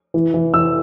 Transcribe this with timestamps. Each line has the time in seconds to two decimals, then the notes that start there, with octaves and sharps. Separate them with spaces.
0.14 E3
0.34 E3
0.54 E3 E6